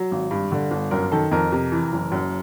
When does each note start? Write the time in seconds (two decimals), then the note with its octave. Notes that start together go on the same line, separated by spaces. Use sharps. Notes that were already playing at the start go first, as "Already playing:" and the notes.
Already playing: F#3
0.11 G#1
0.31 G2
0.52 D3
0.71 G1
0.91 F#2 A#4
1.12 D#3 A4
1.31 F2 A#4
1.52 C3
1.72 E3
1.92 F#1
2.12 F#2